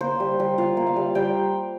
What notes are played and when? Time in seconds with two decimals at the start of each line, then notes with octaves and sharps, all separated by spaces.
0.01 A#3 C5
0.20 G3
0.40 G3
0.58 F4 F5
0.77 A#3
0.87 F5
0.96 G3
1.15 G3 G5